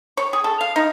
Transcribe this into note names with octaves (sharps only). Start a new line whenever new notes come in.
C#5
G#4
A4
F5
D#4